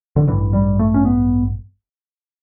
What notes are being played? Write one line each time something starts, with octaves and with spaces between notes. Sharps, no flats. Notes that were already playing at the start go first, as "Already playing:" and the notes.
D3
A1 G2 D3 E3
G3
A3
C#4
B3